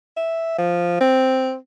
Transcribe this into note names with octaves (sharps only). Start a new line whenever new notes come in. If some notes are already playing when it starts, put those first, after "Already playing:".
E5
F3
C4